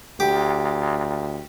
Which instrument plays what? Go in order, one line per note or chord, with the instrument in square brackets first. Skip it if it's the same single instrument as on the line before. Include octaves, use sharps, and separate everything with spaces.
[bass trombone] D2 [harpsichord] G4